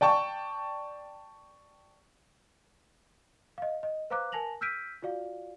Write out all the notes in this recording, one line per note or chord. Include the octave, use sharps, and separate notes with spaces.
D5 G5 A5 C#6
D#5 F5
D#5
B4 C5 F5 A#5 D6 F#6
A#4 G#5 A5 A#6 F7 F#7
E6 F6 G6 B6 D7 D#7
F4 F#4 D5 F5